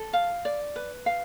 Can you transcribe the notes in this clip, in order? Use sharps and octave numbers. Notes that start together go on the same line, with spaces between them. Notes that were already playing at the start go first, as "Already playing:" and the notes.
Already playing: A4
F5
D5
B4
F5